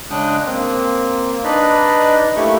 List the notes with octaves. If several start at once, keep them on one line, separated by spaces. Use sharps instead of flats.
C#3 G#3 D4 G5 D#6 F#6
A#3 C4
D4 D#4 B4 D5 D#5 B5
A3 A#3 E4 G4 A4 C#6